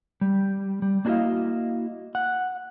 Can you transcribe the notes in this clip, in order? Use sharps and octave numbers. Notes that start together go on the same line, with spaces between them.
G3
G3
A#3 D4 E4 F#4 D#5 F5
F#5